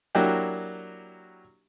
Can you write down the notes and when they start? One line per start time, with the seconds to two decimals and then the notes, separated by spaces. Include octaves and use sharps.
0.15 F#3 A#3 D4 E4 F#4 G4